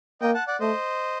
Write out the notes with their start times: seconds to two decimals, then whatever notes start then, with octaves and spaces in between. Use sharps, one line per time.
0.21 A#3 D#5 G5
0.34 F#5 A5
0.47 D5 F#5
0.60 A3 C5 D#5